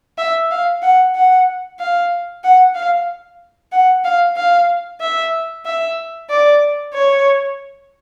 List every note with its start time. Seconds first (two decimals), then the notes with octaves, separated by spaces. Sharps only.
0.18 E5
0.51 F5
0.82 F#5
1.15 F#5
1.80 F5
2.44 F#5
2.75 F5
3.72 F#5
4.04 F5
4.36 F5
5.00 E5
5.65 E5
6.30 D5
6.94 C#5